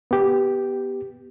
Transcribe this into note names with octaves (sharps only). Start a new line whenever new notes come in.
B3 G4